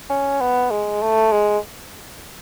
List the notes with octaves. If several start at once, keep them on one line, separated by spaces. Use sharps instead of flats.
C#4
B3
G#3
A3
G#3